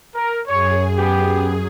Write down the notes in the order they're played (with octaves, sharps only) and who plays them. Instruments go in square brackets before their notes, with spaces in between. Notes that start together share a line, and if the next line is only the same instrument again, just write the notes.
[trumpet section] A#4
[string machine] F#2 G#4 [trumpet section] C#5
[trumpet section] B3 G4